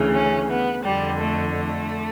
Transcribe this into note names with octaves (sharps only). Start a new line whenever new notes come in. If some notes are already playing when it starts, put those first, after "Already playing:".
Already playing: D2 C#3 E3
C#4
B3
F2 D3 G3
A3
A3